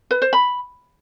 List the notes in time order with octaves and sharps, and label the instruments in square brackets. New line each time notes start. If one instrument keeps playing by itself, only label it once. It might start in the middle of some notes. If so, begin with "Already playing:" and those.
[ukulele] B4
C5
B5